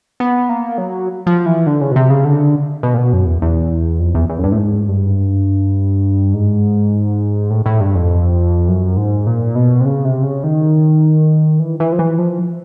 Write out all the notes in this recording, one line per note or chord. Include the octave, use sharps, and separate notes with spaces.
B3
A#3
F#3
F3
E3
D3
C#3
B2
C3
C#3
D3
B2
A#2
B2
F#2
E2
E2
F2
E2
E2
F#2
G2
A2
G#2
G2
G#2
A2
A2
G2
F2
F#2
G#2
A#2
B2
C3
C#3
C3
C#3
D#3
E3
E3
F3
E3
F3